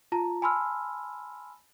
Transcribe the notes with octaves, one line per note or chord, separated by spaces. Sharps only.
F4 A5 A#5
G#5 A5 B5 C6 E6 F6